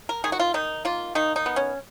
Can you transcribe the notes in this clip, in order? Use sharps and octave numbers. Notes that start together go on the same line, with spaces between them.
A#4
D#3 G#4
F#4
F4
D#3 D#4
A#3 F4
D#3 D#4
D#4
B3
C#4